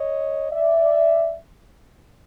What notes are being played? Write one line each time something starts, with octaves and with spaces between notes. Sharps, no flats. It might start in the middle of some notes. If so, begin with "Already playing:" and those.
Already playing: C#5 D#5
D5 E5